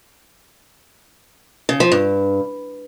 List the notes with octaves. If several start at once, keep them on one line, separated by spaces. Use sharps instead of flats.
C#3
F3
G2